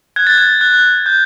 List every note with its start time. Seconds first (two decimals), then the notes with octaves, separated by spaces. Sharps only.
0.16 F#6 G#6
0.27 A6
0.37 G#6
0.61 F#6
1.06 G6